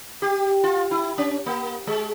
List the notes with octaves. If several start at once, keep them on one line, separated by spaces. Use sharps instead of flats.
G4
F4
E4
C#4
A#3
G#3